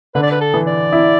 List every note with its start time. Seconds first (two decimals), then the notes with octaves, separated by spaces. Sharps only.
0.15 D3 B4
0.23 D5
0.31 B4
0.41 A4
0.54 E3
0.67 D5
0.93 E4